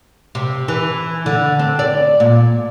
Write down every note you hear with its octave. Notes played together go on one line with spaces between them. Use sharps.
C3
E3
D3
C4
D5
A#2